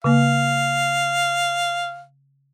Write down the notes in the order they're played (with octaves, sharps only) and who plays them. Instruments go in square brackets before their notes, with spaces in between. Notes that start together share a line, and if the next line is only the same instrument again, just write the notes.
[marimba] C#3 A#3 [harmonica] F5